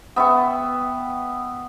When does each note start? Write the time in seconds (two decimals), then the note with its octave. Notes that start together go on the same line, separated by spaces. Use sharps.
0.16 B3 E5 G5 C#6